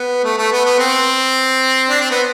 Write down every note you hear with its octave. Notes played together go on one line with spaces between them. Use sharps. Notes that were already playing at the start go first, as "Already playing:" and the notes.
Already playing: B3
A3
A3
B3
B3
C4
D4
C4
B3